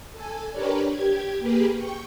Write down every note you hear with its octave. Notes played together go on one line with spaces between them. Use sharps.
A4 G#5
D4 G4 A#4 B4 C#5 D5
G4 G#6
A#3 G4 G#4 B4
G5 C#6